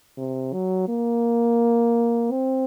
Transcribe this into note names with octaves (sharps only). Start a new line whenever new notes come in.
C3
F#3
A#3
C4